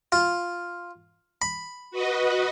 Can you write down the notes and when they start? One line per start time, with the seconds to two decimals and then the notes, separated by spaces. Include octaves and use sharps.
0.12 F4
1.42 B5
1.91 F#4 B4 D#5